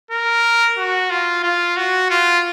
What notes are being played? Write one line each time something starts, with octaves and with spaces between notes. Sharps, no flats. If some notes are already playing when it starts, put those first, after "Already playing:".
A#4
F#4
F4
F4
F#4
F4